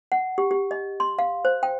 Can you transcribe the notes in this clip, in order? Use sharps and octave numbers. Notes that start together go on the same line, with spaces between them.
F#5
G4
G4
D#5
C6
F5
C5
G5